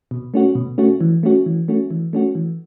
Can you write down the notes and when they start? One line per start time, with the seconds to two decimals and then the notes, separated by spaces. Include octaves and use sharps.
0.11 B2
0.34 A3 C#4 F#4
0.55 B2
0.78 A3 C#4 F#4
1.01 E3
1.23 A3 C#4 F#4
1.46 E3
1.68 A3 C#4 F#4
1.91 E3
2.13 A3 C#4 F#4
2.35 E3